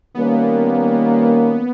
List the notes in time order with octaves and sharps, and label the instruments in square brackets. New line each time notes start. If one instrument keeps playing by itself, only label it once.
[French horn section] D#3 G3 A#3 C#4 [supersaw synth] B3